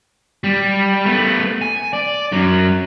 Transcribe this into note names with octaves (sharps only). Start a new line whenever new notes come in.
G3
A3 B3
G#5
D5
F#2 F#3